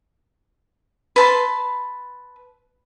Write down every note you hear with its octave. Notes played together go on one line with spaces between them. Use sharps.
B4 A5 C6